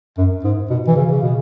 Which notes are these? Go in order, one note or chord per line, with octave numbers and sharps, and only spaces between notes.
F#2
G#2
B2
E3
C#3
C#3
B2